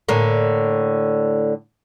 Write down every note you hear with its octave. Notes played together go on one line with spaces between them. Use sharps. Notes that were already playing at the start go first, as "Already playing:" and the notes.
A2 D3 A#3